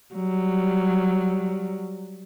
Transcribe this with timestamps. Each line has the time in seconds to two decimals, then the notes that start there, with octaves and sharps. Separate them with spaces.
0.15 F#3 G3